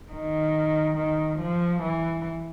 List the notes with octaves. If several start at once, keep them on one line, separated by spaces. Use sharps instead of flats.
D#3
D#3
F3
E3